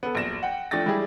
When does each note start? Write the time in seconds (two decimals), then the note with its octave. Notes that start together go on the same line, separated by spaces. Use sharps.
0.03 B3 A4
0.15 A#1 F#2 A#6 E7
0.43 F#5 G5
0.71 F3 A3 D4 G5 A6 A#6
0.86 G3 G#3 E4 G4 G#4 D5